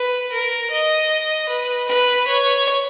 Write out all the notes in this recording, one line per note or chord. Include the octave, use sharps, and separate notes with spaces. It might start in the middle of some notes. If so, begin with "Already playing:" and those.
Already playing: B4
A#4
D#5
B4
B4
C#5